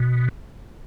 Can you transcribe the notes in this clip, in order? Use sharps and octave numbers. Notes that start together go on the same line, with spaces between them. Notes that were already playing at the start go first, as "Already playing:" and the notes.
Already playing: B2